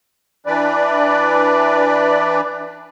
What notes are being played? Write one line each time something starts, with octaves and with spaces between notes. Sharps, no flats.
E3 D4 B4 D5